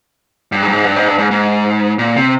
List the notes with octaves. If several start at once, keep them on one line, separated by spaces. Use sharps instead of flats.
G2
G#2
G2
G#2
G2
G#2
G2
G#2
G#2
A#2
C3